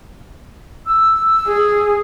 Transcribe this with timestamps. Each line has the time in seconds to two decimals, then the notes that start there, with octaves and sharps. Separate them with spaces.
0.87 E6
1.47 G#4